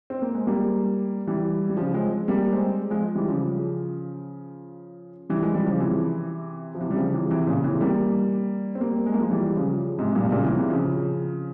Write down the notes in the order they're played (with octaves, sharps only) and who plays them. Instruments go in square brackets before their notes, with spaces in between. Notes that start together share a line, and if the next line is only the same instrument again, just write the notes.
[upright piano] C4
A#3
G#3
G3 A#3
E3 G3
G3
C#3 F3
G#3 C4
G3 A#3
G#3 C4
F3 G#3
E3 G3
C#3 F3
E3 G3
F3 G#3
E3 G3
C#3 F3
C3 E3
F3
C3 E3
G3
C#3 F3
C3 E3
C3 E3
A#2 C#3
C3 E3
G3 A#3
C4
G3 A#3
G#3
A#3
F3 G#3
E3 G3
C#3 F3
G#2 C3
G2 A#2
C3
A#2 C#3
C3 E3
C3 E3
C#3 F3